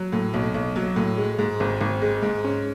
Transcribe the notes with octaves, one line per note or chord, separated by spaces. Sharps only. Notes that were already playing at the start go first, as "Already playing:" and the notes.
Already playing: F#3
A2
B1
B1
F#3
A2
G#3
G#2
G#1
G#1
G#3
G#2
C#4